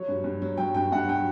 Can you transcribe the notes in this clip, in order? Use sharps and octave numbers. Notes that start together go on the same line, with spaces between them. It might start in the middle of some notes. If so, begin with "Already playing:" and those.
Already playing: F#3 C#5
G2
G2
F#3
F#3 G5
G2 G5
G2 F#5
F#3 G5